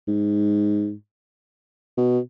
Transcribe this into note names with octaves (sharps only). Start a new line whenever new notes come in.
G#2
B2